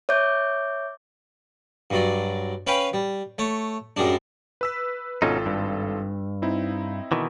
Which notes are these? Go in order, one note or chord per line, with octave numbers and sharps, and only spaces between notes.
C#5 E5 D6 G6
G2 F#3 D5
C#4 B4 F5 G5 G#5 B5
G3
A3 C#5
F#2 G3 G#3 D4
B4 E6 B6
G#1 B2 C#4 D#4 F4 A4
G2
C4 D#4 E4
B2 D#3 E3